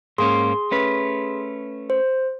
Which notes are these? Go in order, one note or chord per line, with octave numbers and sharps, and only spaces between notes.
G#2 A#3 C#4 G#4 C6
A3 C#4 B4
C5